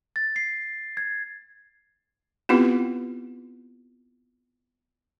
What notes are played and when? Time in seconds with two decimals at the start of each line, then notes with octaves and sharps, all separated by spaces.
0.16 A6
0.36 C7
0.97 G#6
2.49 B3 C4 E4 F4 G4 B4